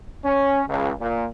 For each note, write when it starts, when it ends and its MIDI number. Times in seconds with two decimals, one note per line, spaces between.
0.25 0.61 61
0.69 0.91 37
1.00 1.27 46